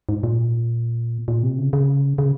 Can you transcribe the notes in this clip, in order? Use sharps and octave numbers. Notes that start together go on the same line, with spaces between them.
G#2
A#2
A#2
C3
C#3
C#3
C#3